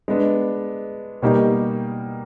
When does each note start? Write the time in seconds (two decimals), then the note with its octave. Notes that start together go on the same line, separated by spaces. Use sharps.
0.08 G#3 B3 D4
1.22 B2 G3 A#3 D#4 G4